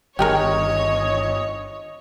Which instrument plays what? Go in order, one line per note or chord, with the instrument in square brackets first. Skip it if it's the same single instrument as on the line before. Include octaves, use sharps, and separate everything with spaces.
[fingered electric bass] G1 G2 D#3 [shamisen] G4 G#4 A#4 [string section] C#5 [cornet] D#5